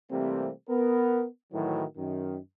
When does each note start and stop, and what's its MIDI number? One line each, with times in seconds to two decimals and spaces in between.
0.11 0.51 48
0.11 0.51 52
0.11 0.51 55
0.11 0.51 57
0.11 0.51 58
0.11 0.51 60
0.69 1.26 59
0.69 1.26 70
1.53 1.85 45
1.53 1.85 51
1.53 1.85 52
1.53 1.85 54
1.97 2.39 42
1.97 2.39 51